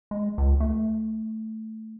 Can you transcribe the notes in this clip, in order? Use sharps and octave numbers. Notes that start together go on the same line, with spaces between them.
G#3
C#2
A3